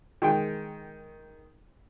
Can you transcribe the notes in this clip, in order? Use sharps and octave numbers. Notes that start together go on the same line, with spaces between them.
D#3 G#3 G5